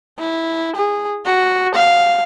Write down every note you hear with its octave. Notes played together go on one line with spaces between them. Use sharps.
E4
G#4
F#4
F5